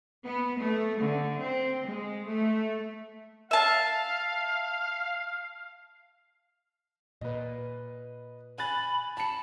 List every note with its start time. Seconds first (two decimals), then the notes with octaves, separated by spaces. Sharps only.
0.25 B3
0.59 A3
0.98 D3
1.40 C4
1.86 G#3
2.28 A3
3.51 E5 F5 A5
7.21 A#2 B4 D#5
8.58 G#5 B5 F#6 A6
9.17 A5 B5 C#7